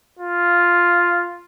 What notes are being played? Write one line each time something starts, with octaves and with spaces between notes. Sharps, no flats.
F4